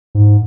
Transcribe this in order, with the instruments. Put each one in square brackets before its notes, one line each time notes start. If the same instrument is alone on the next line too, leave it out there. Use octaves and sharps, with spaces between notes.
[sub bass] G#2